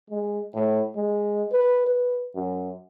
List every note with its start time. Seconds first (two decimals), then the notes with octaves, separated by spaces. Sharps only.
0.10 G#3
0.54 A2
0.96 G#3
1.52 B4
1.86 B4
2.35 F#2